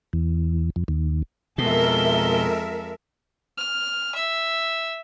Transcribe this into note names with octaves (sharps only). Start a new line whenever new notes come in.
E2
F2
D#2
F2 B2 G#3 A4 A#4 E5 G7
F6
E5